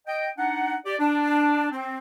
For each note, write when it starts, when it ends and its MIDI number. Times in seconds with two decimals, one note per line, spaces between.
0.07 0.28 75
0.07 0.28 79
0.38 0.75 62
0.38 0.75 63
0.38 0.75 78
0.85 0.95 67
0.85 0.95 74
0.99 1.68 62
1.72 1.97 60